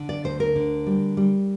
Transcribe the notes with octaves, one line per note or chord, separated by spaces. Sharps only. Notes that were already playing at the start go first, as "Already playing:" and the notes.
Already playing: D3
D5
D2 C5
A#4
D3
G3
G3